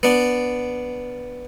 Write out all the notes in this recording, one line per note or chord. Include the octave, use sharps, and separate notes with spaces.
B3 D4